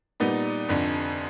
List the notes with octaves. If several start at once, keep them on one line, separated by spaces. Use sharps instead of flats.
A#2 G3 B3 D#4
F1 F2 D3